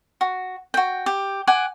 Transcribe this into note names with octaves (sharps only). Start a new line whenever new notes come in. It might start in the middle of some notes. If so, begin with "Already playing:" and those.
F#4
F#4 G5
G4
F#5 G#5 D6